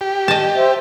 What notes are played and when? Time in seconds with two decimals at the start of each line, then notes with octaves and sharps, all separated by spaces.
0.01 G4
0.28 D#5 A5
0.56 C5 E5